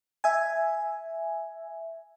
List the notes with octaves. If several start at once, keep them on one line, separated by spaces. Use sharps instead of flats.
E5 G#5